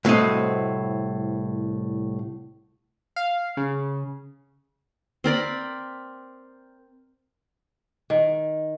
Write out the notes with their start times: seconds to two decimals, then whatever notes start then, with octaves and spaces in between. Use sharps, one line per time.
0.05 C2 A2 C4 F#4 D#5
3.16 F5
3.57 C#3
5.24 C4 A#4 D5 B5
8.10 D#3